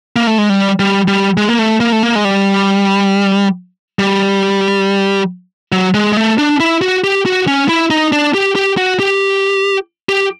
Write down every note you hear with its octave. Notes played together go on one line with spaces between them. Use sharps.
A#3
A3
G#3
G3
G3
G3
G#3
A#3
A3
A#3
A3
A#3
G#3
G3
G3
F#3
G#3
G#3
A3
D4
E4
F#4
G4
F#4
C#4
E4
D#4
D4
G4
G4
F#4
G4
G4